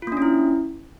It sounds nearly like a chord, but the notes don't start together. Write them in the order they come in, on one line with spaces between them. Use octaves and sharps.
F4 A#3 D4 C#4 E4